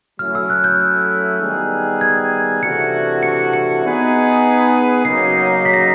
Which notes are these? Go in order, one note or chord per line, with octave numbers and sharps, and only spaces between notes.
F#3 A3 C#4 E4 F6
E6
F#6
G6
D#3 G3 B3 D#4 G#4
G#6
C3 E3 A3 D4 F#4 C#7
C#7
C#7
B3 D#4 G#4 B4
C#3 F#3 A#3 D#4 C7
B6
A#6